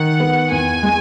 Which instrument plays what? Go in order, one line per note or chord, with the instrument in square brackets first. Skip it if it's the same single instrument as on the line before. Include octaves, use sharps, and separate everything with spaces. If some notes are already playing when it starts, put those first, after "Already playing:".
Already playing: [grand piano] D#3 [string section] F#5
[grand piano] B3
[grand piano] E2 [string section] G#5
[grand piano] G#3